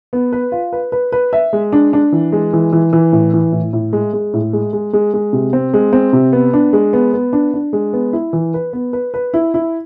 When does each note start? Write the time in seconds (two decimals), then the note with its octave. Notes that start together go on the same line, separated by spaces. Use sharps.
0.13 B3
0.32 B4
0.52 F4
0.73 B4
0.92 B4
1.12 B4
1.33 E5
1.53 G#3
1.72 D4
1.93 D4
2.12 E3
2.32 G#3
2.53 E3
2.73 E3
2.93 E3
3.12 A2
3.33 E3
3.52 A2
3.73 A2
3.93 G#3
4.13 G#3
4.34 A2
4.53 G#3
4.73 G#3
4.93 G#3
5.14 G#3
5.33 C3
5.53 C4
5.74 G#3
5.93 C4
6.13 C3
6.33 B3
6.53 D4
6.73 G#3
6.93 B3
7.14 B3
7.33 D4
7.54 D4
7.73 G#3
7.93 B3
8.13 E4
8.33 E3
8.54 B4
8.73 B3
8.93 B4
9.14 B4
9.34 E4
9.54 E4